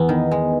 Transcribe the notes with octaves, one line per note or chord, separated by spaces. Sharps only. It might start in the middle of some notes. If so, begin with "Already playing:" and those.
Already playing: E2 B3
D#3
G#3